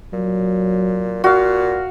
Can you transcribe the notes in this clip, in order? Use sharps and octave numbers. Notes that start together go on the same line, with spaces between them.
A#2 F#3
A#2 F#4 F5